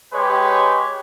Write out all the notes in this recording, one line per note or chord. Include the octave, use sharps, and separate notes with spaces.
G#3 G4 B4 C#5